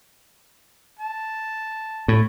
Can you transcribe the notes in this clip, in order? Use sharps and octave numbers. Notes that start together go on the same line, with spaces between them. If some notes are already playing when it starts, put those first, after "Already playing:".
A5
A2